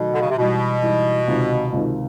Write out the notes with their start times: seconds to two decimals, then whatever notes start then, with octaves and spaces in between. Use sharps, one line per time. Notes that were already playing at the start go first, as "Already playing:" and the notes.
Already playing: B2 D#3 F#3 A3
0.13 D3
0.21 C#3
0.29 C3
0.37 G#2 B2 E3 G3
0.82 G#2 E3 G3
1.27 C#2 C3 D#3
1.72 C#2 C3 D#3